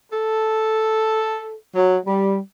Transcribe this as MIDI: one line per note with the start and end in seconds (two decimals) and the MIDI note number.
0.11 1.53 69
1.75 1.97 54
2.06 2.39 55